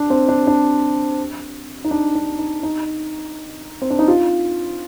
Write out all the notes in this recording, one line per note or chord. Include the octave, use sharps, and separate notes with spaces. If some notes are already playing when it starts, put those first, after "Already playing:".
Already playing: D4
C4
D4
D4
D#4
D4
D4
D#4
D#4
C4
D4
D#4
F4